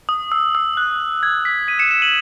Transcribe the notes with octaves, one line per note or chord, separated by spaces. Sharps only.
D#6
E6
E6
F#6
G#6
B6
B6 D#7
C#7 E7
C#7 E7
D#7 F#7